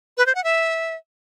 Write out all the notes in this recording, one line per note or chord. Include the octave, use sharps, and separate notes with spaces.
B4
C5
F#5
E5